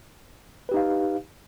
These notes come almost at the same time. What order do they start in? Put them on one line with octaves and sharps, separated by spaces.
B4 G4 D#4 F5